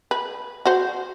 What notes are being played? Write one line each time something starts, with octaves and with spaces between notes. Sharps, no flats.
B4
F#4 C5